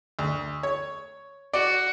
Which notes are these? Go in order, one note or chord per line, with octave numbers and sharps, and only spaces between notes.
D2
C#5
F#4 D5